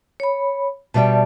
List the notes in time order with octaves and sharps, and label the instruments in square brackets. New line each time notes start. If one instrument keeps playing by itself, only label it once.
[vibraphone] C#5 B5
[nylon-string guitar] B2 G3 G5 [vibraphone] D5 E5 A5